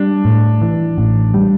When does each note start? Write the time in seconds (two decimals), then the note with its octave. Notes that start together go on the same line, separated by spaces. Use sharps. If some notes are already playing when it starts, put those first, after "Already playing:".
Already playing: G3 D4
0.25 A2
0.62 E3
0.98 A1
1.34 G3